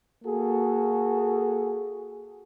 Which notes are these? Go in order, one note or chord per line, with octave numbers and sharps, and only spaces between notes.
A#3 F#4 G#4 A4